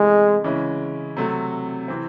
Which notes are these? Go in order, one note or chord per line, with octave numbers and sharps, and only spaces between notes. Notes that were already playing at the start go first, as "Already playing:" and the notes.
Already playing: C3 E3 G#3 A3
C#3 E3 G#3 C#4 E4
C3 F#3 A3
C3 E3 C4